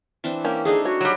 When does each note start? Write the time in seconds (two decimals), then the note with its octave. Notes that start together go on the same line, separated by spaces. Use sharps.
0.24 E3 C4 D4
0.45 A#3 C#4 G4
0.65 A3 D4 D#4 G#4
0.85 F#4 C#5
1.01 F#3 G3